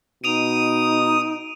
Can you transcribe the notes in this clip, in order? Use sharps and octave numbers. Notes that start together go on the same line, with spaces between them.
B2 D#4 D#6 D7 D#7 F7